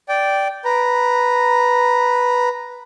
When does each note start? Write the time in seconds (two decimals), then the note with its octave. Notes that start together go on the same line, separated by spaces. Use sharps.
0.09 D5 G5
0.65 B4 A#5